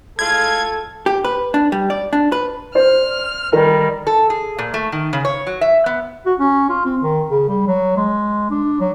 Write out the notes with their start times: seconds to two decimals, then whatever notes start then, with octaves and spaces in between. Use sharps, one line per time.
0.19 A2 G#3 F4 A4 G#6
1.06 G4
1.24 B4
1.54 D4
1.72 G3
1.90 D5
2.13 D4
2.32 B4
2.75 C5 D5 F6
3.53 D#3 G3 A#4
4.07 A4
4.30 G#4
4.59 A#2
4.74 A3
4.92 D#3
5.13 C#3
5.25 C#5
5.47 F#3
5.61 E5
5.86 B3
6.26 F#4
6.39 C#4
6.70 F4
6.85 C4
7.02 D#3
7.30 C#3
7.49 G3
7.67 F#3
7.97 G#3
8.50 D4
8.80 F#3